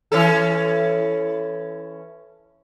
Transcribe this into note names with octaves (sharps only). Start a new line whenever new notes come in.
E3 C#4 A4